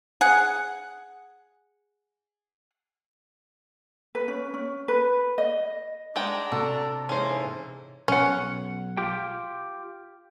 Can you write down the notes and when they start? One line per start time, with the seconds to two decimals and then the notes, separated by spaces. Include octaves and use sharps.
0.21 G#4 F#5
4.15 B4
4.28 C#4
4.54 C#4
4.88 B4
5.38 D#5
6.16 G#3 D4 F#5 G5 A#5
6.52 C3 F#4 A4
7.09 G#2 E3 A#3 C#4 C5
8.08 B1 C#4 F#5
8.97 F4 G4 G5